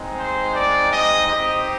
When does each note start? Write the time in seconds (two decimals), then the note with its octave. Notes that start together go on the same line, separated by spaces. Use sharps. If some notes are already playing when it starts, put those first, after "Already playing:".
Already playing: G#3 C4 D#4
0.18 C5
0.54 D5
0.90 D#5
1.27 C4 D#4 G4 D#5